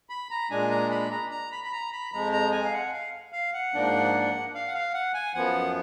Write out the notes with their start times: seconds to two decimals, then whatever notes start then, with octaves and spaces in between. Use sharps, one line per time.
0.10 B5
0.31 A#5
0.50 A#2 G#3 D4 G#5
0.71 A#5
0.91 B5
1.11 A#5
1.31 A#5
1.52 B5
1.64 B5
1.72 A#5
1.92 B5
2.12 F2 F3 G#3 A#5
2.32 A#5
2.52 G#5
2.64 F5
2.73 F#5
2.92 F5
3.33 F5
3.54 F#5
3.74 G#2 F3 A#3 D4
4.55 F5
4.67 F#5
4.74 F5
4.94 F#5
5.14 G#5
5.34 F#2 F3 B3 F#5